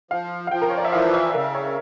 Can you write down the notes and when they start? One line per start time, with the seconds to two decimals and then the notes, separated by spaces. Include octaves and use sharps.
0.11 F3 F5
0.47 F5
0.51 F3 G5
0.62 A#4
0.70 C#5
0.78 D5
0.85 E5
0.92 E3 F5
1.13 E5
1.34 C#3 A#4
1.55 C#5